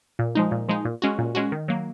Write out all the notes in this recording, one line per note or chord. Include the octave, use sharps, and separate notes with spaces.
A#2
F3 G#3 D#4
A#2
F3 G#3 D#4
A#2
G#3 C#4 F#4
A#2
G#3 C#4 F#4
D#3
F#3 A#3